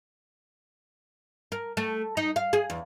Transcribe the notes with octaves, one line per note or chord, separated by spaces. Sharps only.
A#4
A3
D#4
F5
G#4
E2